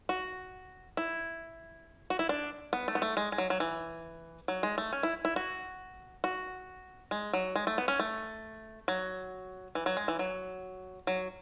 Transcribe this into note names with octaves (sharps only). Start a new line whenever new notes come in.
F#4
E4
F#4
E4
D4
B3
A3
B3
A3
G#3
G#3
F#3
F#3
E3
F#3
G#3
A3
C#4
E4
E4
F#4
F#4
G#3
F#3
G#3
A3
B3
C#4
A3
F#3
E3
F#3
G#3
E3
F#3
F#3